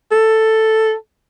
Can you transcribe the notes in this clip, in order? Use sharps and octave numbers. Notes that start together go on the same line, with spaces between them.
A4